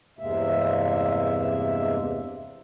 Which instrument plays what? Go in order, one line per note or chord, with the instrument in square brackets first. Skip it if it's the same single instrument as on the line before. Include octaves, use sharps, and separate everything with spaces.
[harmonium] E2 G2 C3 G#3 A#3 E5